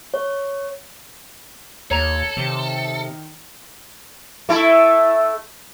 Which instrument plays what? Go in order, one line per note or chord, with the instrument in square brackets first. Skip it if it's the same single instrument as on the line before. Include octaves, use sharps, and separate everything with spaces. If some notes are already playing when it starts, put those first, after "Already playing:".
[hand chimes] C#5
[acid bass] D#2 [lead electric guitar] A4 [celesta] C#5 A#5 F7 [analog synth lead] G#6
[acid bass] C3 [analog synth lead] D#3
[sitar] A3 E4 A4